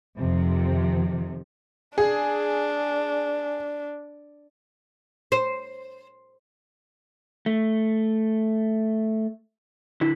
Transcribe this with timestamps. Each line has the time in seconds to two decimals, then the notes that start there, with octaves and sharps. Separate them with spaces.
0.19 F2 C3 D#3 F3
1.98 D4 G#4
5.32 C5
7.46 A3
10.01 D3 E4